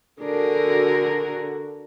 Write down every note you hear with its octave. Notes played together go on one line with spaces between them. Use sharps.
D3 D4 F#4 G#4 A#4